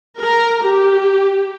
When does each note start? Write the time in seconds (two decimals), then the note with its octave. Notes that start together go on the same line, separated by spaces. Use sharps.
0.19 A#4
0.63 G4